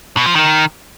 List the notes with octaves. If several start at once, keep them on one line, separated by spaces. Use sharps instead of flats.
B2
F3
D#3